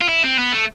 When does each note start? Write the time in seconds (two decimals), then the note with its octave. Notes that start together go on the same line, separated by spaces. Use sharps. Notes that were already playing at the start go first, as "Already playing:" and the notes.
0.01 F4
0.09 E4
0.24 C4
0.39 B3
0.53 A3